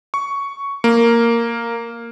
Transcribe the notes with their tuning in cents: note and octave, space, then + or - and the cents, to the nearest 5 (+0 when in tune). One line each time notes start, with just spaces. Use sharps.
C#6 +5
A#3 -5